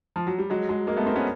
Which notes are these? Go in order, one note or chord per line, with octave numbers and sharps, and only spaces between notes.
F3
F#3
G3
F#3 G#3
F#3 G#3
G#3 A#3
A3 B3
A#3 C4
B3 C#4